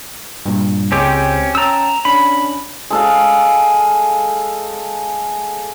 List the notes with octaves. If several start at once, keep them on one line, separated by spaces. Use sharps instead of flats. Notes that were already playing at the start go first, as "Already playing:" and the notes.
G2 A#2
C#2 G#3 C4 C#4 G4 C5
C#4 G5 A5 A#5 E6
C#4 D4 B5
G#3 A4 F5